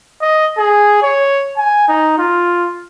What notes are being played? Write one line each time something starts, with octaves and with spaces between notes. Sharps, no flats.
D#5
G#4
C#5
G#5
D#4
F4